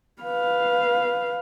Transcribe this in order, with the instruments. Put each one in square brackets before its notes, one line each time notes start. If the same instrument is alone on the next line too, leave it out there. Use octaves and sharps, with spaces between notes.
[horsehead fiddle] B4 F5